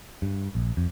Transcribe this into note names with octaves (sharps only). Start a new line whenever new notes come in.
G2
A#1
F2